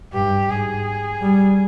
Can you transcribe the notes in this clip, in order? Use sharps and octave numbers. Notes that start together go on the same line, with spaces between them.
G2 G4
G#2 G#4
G3